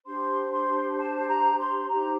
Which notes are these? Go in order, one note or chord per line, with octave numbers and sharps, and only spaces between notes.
D4 G4 C5 C6
C6
A5
A#5
C6
D#4 G4 C5 A#5